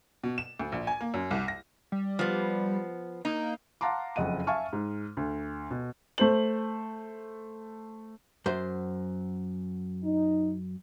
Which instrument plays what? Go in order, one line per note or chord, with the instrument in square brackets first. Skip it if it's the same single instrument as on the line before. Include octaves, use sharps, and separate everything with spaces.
[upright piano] B2
E7
D2
A#1
G#5
A#3
F#2
C2
A#6
[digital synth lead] G3
[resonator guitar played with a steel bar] F3 B3
[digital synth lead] A#3 [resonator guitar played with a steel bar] D#4
[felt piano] F5 F#5 A5 A#5 C6 D6
F#1 F2 D#5 F#5 D#7
E5 F5 G#5 A5 C#6 F6
G#2
D2
B2
[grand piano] A3 C5 F#7
[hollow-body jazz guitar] F#2 C5
[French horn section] D#4